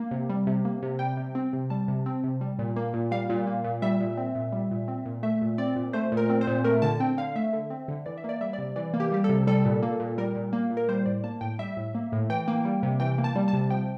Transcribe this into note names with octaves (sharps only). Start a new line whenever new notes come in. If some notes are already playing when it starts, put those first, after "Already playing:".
Already playing: A#3
C3
G3
C3
A#3
C3
G3 G5
C3
C4
C3
G3 A5
C3
C4
C3
G3
A#2
A#3
A#2
G3 F5
A#2
A#3
A#2
G3 E5
A#2
C4
A#2
G3
A#2
C4
A#2
A3 E5
A#2
C4 D5
A#2
A3 C5
A#2
A#4
C4
C5
A#2
A3 A#4
D3 A5
C4 G5
D3 F5
A3 E5
D3
C4
D3
E3 D5
E5
A#3 D5
G3 E5
D5
C3
E3 D5
A#3
G4
G3 G4
C3 A4
G3 A4
A#2
A#3
A#2
G3 A#4
A#2
A#3
A#2
A#4
G3 C5
A2 D5
A#3 A5
A2 G5
G3 E5
A2
A#3
A2
E3 G5
A#3
G3
C3
E3 G5
A#3
A5
G3
A5
C3
F3 G5